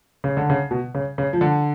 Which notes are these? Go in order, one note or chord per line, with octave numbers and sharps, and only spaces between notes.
C#3
D3
C#3
B2
C#3
C#3
F3
D3